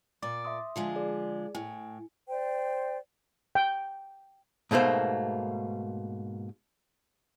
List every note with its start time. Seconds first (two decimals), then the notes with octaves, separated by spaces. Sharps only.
0.22 A#2 D5 D6 A6
0.45 E5 C6 D#6
0.76 D3 F3 G#3
0.96 G#4 D5
1.55 A2 G#5
2.29 C5 D5 G5
3.55 G5
4.71 G#2 B2 A3 A#3 C5